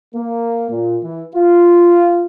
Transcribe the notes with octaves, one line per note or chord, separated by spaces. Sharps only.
A#3
A#2
E3
F4